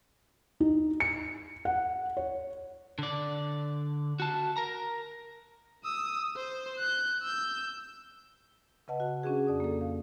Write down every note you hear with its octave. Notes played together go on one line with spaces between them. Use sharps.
D#4
C#7
F#5
C#5
D3 D5
F#4 A5
A#4 A#5
D#6 E6
C5
F#6 G6
E6 G6
C#3 B4 D#5 F#5 A5
F#4 F#5
C#4 D4 F#4 G#4
F2 D5 D#6
A#3 A4
F5